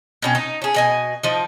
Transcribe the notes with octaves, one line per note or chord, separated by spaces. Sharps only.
B2 C#4 G5
D#4
C#4 G#4
B2 D#5 G#5
F3 D#4